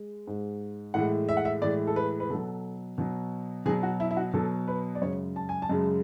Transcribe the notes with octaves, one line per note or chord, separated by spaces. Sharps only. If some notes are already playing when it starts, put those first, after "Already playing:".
Already playing: G#3
G#2 G#3
A2 E3 G#3 F#5
E5
F#5
E5
A2 E3 G#3 D5
A4
B4
B4
B2 F#3 A4
B2 F#3
B2 F#3 G#4
F#4
E4
E4
F#4
B2 F#3 A4
B4
D5
F#2 C#3 G#3 C#5
A5
G#5
A5
F#2 C#3 G#3